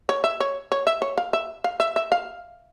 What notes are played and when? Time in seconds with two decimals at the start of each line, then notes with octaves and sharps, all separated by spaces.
0.09 C#5
0.24 E5
0.40 C#5
0.72 C#5
0.87 E5
1.02 C#5
1.17 F5
1.33 E5
1.64 F5
1.80 E5
1.96 E5
2.12 F5